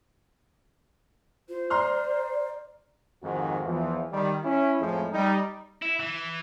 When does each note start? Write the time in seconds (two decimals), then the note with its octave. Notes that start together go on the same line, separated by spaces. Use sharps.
1.49 F4 C5
1.70 D5 A#5 C6 F6
3.23 F2 G#2 D#3 F#4
3.65 E2 E3 F3
4.12 D#3 G3
4.44 C#4 E4
4.80 F2 A2 F3 G#3
5.13 G3 D#4
5.82 E4
6.00 E3